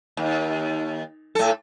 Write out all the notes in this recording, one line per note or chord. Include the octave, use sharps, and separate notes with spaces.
D#2
A2 A4